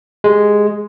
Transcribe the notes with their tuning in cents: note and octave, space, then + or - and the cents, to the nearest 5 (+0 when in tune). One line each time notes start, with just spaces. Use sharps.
G#3 +0 G4 +15